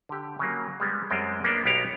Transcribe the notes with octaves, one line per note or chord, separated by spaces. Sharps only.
D3 G4
C#3 F#3 A#3
G3 G#3 B3
F#2 G3 G#3 C4 G5
A#3 B3 D4
B1 B3 G4 C#5 F5 A#5